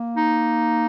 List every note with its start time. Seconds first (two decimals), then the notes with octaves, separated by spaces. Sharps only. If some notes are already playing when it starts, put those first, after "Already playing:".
Already playing: A#3
0.17 D#4